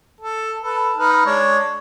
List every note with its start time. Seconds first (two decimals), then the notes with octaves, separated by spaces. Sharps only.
0.21 A4
0.63 A4 B4
0.97 D#4 B4 F6
1.26 G#3 D4 C#5